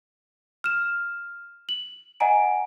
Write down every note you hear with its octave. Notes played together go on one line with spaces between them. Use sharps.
F6 E7
F#7
D#5 F#5 G#5 A#5 D7